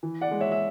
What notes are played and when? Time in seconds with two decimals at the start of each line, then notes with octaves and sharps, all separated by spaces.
0.03 E3
0.21 D5 F#5
0.31 G#3
0.40 C#5 E5
0.52 E5